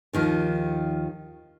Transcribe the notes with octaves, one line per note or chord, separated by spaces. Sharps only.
D#2 D#3 F3